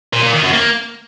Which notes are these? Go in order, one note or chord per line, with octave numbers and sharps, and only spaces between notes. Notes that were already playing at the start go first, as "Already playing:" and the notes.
A#2
A#2
D#3
F#2
A#3